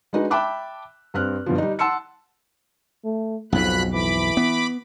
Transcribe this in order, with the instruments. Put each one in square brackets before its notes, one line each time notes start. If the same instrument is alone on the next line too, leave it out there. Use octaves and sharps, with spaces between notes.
[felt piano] G#3 D4 D#4 F#4 B4
E5 G5 A5 B5 D6 F#6
G2 C4 F6 F#6
G2 B2 D3 F3
G3 D#4
F#5 A5 C6 E6 C#7
[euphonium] A3
[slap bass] B1 F2 G#2 [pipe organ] B2 B5 F#6 [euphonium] F3
[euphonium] E3 [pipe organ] B5 D6
[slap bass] B3